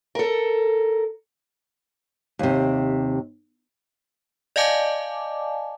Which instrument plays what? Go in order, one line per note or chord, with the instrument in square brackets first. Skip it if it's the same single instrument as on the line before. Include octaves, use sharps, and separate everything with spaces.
[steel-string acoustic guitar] A4 A#4
[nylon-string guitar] D#2 C3
[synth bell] D5 D#5 F5 G#5 A5 D6